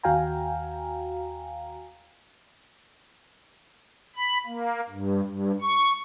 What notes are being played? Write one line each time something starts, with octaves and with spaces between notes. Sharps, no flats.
D#2 F#4 F5 G5 G#5 A#5
B5
A#3
G2
G2
C#6